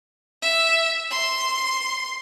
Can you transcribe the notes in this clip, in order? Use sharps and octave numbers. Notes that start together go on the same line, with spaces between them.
E5
C6